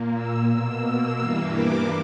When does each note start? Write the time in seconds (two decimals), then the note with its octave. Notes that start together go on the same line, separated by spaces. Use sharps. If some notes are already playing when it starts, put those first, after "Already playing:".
Already playing: A#2 A#3
0.13 E6
0.49 B2 A#3 E6
1.19 G2 E3 A#3
1.54 D6